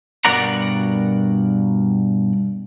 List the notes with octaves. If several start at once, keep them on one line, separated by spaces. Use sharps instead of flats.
G2 B2 A#4 D5 F#5 A#5